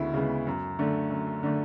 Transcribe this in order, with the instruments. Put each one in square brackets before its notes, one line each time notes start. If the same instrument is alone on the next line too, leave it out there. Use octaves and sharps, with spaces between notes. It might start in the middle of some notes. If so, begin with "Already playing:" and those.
Already playing: [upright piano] D2 C#3 G#3 B3 E4
C#3 G#3 B3
F#2
D3 A3
F#2
D3 A3